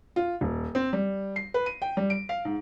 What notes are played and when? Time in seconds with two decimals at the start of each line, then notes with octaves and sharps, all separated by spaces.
0.16 F4
0.41 D#1
0.75 C4
0.93 G3
1.36 C7
1.54 B4
1.66 D#7
1.82 G5
1.97 G3
2.10 D7
2.29 F5
2.45 G#2